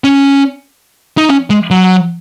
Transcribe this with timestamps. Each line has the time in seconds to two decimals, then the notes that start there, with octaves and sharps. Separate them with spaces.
0.04 C#4
1.18 D#4
1.29 C#4
1.50 G#3
1.71 F#3